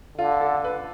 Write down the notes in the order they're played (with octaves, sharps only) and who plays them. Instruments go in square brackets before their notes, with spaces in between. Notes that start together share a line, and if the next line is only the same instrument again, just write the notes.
[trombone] D3 [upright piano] F4
[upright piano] A4
B4